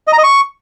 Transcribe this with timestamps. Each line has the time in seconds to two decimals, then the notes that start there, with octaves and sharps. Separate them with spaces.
0.08 D#5
0.13 A#5
0.18 D#5
0.24 C#6